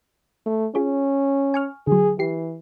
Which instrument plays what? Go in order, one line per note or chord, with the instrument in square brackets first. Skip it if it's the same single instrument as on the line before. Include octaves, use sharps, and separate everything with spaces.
[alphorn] A3
[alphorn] C#4 [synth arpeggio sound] F4 G#4 C#5
[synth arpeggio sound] G#5 C#6 F6
[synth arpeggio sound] D3 F#3 [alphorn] G#4
[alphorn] E3 [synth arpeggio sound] G4 C7